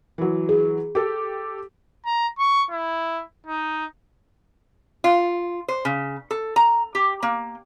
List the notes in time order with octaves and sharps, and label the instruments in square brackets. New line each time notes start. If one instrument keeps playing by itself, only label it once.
[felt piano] E3 F#3
[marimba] G#4
[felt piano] G4 A4
[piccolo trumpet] A#5
C#6
E4
D#4
[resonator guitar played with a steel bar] F4
C5
C#3
A4
A#5
G4
A#3